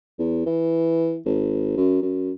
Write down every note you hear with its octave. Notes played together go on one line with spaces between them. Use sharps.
E2
E3
G#1
F#2
F#2